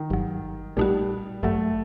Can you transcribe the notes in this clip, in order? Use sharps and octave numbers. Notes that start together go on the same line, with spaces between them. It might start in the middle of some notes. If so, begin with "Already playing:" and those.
Already playing: D#3
G1 G2 F#3
A#1 A#2 G3 A3 D#4 F#4
A1 G2 F#3 A3